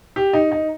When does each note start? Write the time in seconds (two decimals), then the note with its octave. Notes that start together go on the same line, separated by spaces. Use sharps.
0.16 G4
0.33 D#4
0.52 D#4